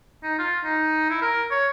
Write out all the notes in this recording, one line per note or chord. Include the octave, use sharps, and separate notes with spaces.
D#4
F4
D#4
E4
A#4
C#5